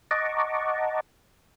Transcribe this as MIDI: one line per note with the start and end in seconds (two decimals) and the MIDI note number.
0.11 1.00 75
0.11 1.00 78
0.11 1.00 81
0.11 1.00 82
0.11 1.00 85
0.11 1.00 86